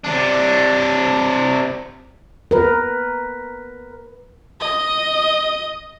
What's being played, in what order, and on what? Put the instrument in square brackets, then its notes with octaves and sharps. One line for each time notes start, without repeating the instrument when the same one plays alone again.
[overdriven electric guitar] C3 D4
[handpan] A#4 B4
[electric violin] D#5